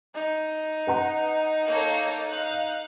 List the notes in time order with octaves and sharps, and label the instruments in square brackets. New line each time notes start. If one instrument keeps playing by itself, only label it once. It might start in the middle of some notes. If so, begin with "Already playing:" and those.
[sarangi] D#4
[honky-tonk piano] B4 F#5 A#5
[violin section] A#3 A4 C#5
F5 F#6